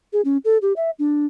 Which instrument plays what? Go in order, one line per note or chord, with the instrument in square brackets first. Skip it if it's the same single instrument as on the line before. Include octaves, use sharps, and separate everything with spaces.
[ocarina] G#4
C#4
A4
G4
E5
D4